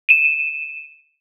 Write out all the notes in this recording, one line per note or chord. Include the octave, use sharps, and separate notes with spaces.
D#7 E7